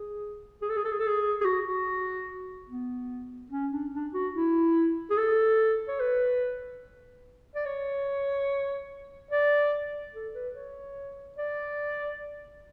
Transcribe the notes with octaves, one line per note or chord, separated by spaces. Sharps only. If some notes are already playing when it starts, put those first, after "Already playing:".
Already playing: G#4
G#4
A4
G#4
A4
G#4
A4
G#4
G#4
F#4
F#4
B3
C#4
D4
D4
F#4
E4
G#4
A4
C#5
B4
D5
C#5
D5
A4
B4
C#5
D5